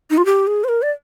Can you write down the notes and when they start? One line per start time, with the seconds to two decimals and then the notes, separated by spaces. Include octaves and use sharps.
0.10 D#4
0.17 F4
0.25 G4
0.47 G#4
0.64 C5
0.69 A#4
0.82 D5